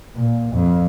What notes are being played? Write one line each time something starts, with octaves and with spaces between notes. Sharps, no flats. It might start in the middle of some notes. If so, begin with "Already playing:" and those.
A#2
F2